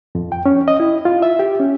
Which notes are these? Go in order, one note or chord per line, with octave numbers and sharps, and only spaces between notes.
F2
G5
C#4
D#5
E4
F4
E5
G4
C#4